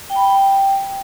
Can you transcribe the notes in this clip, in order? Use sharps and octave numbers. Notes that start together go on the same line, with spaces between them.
G5
B5
G5